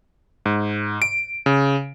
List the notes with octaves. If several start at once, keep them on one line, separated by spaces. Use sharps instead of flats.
G#2
D7
C#3